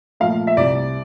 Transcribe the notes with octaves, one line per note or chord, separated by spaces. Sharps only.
A#2 F3 A3 F5
E5
C2 D5